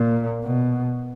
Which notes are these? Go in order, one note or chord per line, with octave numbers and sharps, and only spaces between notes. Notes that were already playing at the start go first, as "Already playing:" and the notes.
Already playing: A#2
B2